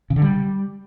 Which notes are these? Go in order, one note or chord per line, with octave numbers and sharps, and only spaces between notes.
C#3
D3
G3